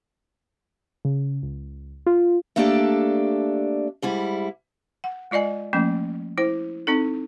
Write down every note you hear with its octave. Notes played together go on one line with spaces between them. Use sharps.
C#3
C#2
F4
A3 A#3 D4 G4 A4 D5
G#2 G3 E4
F#5
G#3 F4 D5 D#5 G#5
F3 A3 A#3 C#4
E4 C5
C4 D#4 A4